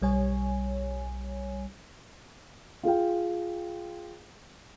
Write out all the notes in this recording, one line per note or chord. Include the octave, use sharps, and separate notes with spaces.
B1 G3 C#5 G#5
F4 G#4 F5 G5